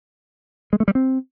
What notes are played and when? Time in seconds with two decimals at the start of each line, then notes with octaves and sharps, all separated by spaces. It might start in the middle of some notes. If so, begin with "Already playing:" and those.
0.73 G#3
0.80 A3
0.88 G3
0.95 C4